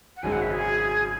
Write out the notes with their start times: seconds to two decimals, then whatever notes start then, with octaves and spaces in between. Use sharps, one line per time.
0.17 F#5
0.23 G#1 F#2 C#3 G#3 G#5
0.32 F#5
0.42 E5
0.52 G#4